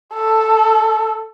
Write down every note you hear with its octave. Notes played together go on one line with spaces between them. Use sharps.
A4